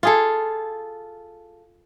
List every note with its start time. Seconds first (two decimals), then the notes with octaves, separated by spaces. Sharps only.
0.03 F4 G#4 A4